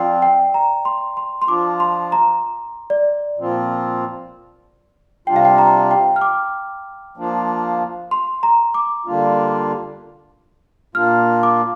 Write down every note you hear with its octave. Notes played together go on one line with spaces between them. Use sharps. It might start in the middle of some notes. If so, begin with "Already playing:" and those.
Already playing: F3 C4 F4 D5 G5
G5
A#5
C6
C6
C6
F3 D4 F4 D6
C6
A#5
D5
A#2 F3 C4 F4
C3 G3 D4 F4 G5
F5
G5
A#5
G5
F6
D6
F3 A#3 D4 F4
C6
A#5
D6
D3 G3 A#3 D4 F4
A#2 A#3 D4 F4 F6
D6